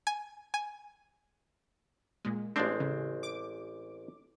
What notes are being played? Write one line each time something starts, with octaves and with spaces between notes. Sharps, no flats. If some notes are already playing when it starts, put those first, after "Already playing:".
G#5
G#5
A#2 G#3
A1 G#3 A3 C4 D4
C#3
D6